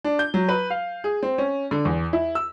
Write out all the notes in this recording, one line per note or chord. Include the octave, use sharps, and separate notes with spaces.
D4
G6
F#3
B4
F5
G#4
C4
C#4
D3
E2
E4
E6